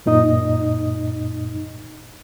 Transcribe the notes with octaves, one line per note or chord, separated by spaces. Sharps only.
F#2 A#2 D#4 D#5 D#6